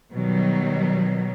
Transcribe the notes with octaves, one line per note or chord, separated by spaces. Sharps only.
B2 D#3 F#3 G3